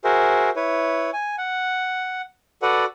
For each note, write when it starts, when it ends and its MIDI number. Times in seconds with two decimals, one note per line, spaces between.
0.04 0.50 66
0.04 0.50 68
0.04 0.50 70
0.04 0.50 72
0.04 0.50 76
0.56 1.10 64
0.56 1.10 71
0.56 1.10 73
1.13 1.36 80
1.38 2.21 78
2.62 2.85 66
2.62 2.85 69
2.62 2.85 71
2.62 2.85 74
2.62 2.85 78